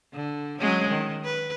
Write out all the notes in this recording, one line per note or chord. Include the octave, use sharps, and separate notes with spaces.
D3
F#3 G#3 C#4
D#3
B4